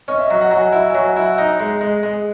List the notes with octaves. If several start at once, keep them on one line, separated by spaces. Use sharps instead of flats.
C#4 D#5
E5
D#5
F#3
F#5
F#3 G#5
F#5
E4 G#5
G#5
F#3
F#5
E4
F#5
D#4
G#3
G#3
G#3